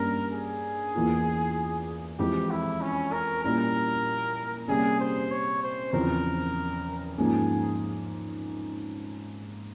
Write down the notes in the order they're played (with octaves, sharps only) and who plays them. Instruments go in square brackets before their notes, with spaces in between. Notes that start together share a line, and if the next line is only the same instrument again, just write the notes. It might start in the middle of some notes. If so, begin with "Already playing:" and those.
Already playing: [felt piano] G2 G3 A#3 C#4 [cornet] A#4
[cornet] G#4
[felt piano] E2 E3 A#3 F4
[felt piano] F2 E3 G#3 C4 [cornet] G4
[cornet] E4
C#4
A#4
[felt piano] A#2 G3 C#4 E4 [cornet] A#4
[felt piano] C3 G3 A#3 C#4 [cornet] G#4
[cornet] C5
C#5
C5
[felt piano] E2 C#3 F3 C4 [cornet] A#4
[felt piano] G#2 F3 A#3 C#4 [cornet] G#4